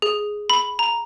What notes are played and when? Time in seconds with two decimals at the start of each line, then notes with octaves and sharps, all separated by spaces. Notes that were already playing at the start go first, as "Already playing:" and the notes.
0.02 G#4
0.50 B5
0.79 A#5